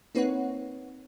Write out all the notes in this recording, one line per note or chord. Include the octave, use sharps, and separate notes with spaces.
A#3 C4 D#4 B4 C#5 F#5